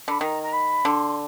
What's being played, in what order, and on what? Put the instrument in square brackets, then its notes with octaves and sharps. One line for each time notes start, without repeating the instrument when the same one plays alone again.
[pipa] D3 [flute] B5
[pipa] D#3 [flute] A#5
[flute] A#5
B5
[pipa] D3 [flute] C6